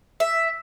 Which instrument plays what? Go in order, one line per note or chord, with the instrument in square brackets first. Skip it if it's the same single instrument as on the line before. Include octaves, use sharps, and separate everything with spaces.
[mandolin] E5